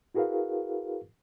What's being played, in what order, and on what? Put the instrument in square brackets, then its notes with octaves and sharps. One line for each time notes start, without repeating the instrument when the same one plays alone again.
[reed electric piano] E4 F#4 G#4 A#4 B4 F5